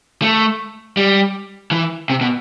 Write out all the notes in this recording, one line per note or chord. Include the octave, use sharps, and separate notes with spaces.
A3
G3
E3
C3
B2